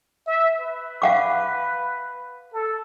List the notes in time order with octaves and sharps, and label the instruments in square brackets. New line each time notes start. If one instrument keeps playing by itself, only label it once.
[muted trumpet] E5
B4
[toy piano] F5 F#5 D6
[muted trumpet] A4